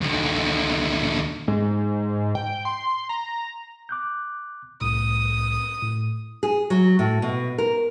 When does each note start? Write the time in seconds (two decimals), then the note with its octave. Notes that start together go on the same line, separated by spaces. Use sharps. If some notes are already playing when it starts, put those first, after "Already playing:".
0.01 D#2 D3
1.48 G#2
2.35 G5
2.65 C6
3.09 A#5
3.89 D6 F#6 G6
4.81 C2 A2 D#6
5.82 A2
6.43 G#4
6.70 F#3
6.99 A2
7.22 B2
7.58 A#4